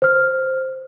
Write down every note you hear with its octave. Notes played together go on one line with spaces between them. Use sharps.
C5 F6